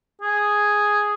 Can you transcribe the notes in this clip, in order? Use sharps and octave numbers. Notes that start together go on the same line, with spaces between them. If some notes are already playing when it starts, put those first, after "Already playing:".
G#4